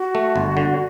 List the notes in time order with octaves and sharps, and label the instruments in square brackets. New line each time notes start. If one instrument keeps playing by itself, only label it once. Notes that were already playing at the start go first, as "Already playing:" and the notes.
Already playing: [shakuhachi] F#4
[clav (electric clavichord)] A3
G1
D3